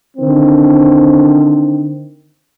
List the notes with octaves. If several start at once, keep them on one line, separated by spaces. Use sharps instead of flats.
D3 D#3 C4